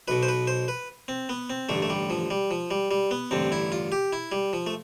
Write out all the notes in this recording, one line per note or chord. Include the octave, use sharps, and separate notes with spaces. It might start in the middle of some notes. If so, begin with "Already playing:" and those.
B1 B2 B4
C5
B4
C5
B4
C4
B3
C4
A1 G2 D3 A3
A3
G3
F3
G3
F3
G3
G3
B3
A1 G2 D3 C4
E4
F4
G4
E4
G3
F3
A3